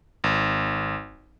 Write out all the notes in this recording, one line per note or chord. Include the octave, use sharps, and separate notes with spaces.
G#1